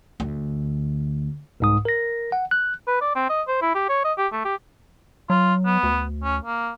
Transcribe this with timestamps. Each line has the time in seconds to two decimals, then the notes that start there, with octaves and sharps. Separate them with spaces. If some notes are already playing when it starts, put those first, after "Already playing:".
0.20 D2
1.60 C2 G#2 D#6
1.85 A#4 A#6
2.32 F#5
2.51 F#6
2.87 B4
3.01 D5
3.15 C4
3.29 D#5
3.48 C5
3.61 E4
3.75 G4
3.89 C#5
4.04 D#5
4.18 G4
4.32 A3
4.45 G4
5.30 F#3 F4
5.66 B3
5.83 D2
6.23 C#4
6.43 A#3